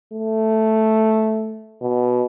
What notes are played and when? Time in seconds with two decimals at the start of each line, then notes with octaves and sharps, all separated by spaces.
0.14 A3
1.82 B2